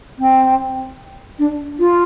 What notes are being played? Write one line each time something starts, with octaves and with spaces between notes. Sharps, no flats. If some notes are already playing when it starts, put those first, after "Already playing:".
C4
D4
F4